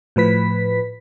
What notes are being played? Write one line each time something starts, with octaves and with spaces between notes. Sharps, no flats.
A2 F3 B4 B6